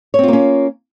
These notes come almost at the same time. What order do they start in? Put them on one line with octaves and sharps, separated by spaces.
C#5 C4 F4 A#3 C#4